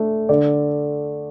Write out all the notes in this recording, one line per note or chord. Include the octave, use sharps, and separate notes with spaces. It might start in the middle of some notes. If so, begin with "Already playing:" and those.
Already playing: A3 D4
D3 D5